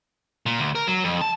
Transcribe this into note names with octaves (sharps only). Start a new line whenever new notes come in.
A#2
D2
A#4
F#3
F2
A5